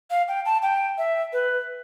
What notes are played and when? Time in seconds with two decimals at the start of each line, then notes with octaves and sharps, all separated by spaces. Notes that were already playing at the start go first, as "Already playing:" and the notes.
0.10 F5
0.28 G5
0.46 A5
0.62 G5
0.98 E5
1.33 B4